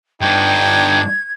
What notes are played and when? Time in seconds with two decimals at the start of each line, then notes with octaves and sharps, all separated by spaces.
0.21 G2 B3 D4 D#4 G5 G#6